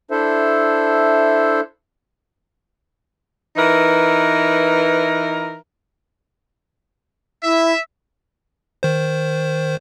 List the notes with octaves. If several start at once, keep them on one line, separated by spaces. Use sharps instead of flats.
D4 E4 A4 C5 E5
E3 D#4 A#4 B4 E5
E4 E5
D#3 C5